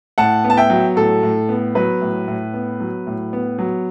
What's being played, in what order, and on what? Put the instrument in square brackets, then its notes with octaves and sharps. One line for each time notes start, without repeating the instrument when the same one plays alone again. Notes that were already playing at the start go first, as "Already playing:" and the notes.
[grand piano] A2 F#5 A5
B3
A5
E5 G5
F#3
A2 A4
A2
B3
F#3 B4
A2
A2
B3
F#3
A2
B3
F#3